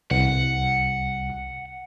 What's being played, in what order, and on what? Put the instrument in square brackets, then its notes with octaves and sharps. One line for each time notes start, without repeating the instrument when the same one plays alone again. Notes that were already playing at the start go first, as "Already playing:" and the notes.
[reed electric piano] C2 [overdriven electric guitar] F#5